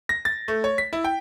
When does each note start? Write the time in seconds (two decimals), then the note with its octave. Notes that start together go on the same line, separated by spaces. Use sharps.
0.09 A#6
0.25 A6
0.48 A3
0.64 C#5
0.78 B6
0.93 E4
1.04 G5